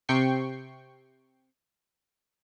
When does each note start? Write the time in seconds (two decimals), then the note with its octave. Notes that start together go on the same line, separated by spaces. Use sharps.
0.09 C3 G5 C#6 C7